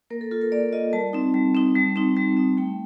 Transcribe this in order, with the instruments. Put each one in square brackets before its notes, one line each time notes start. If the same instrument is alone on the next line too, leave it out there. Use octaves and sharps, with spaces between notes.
[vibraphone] A#3 A#4
A4
F4 A4
A#4
A#3 D5
F4 D#5
G3 A5
C4 D#4
G3
C4 D#4
G3
C4 D#4
G3
C4 D#4
A3 G5